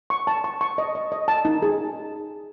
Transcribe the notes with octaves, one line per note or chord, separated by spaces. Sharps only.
C#6
A5
C#6
C#6
D#5
D#5
D#5
A5
D#4
G#4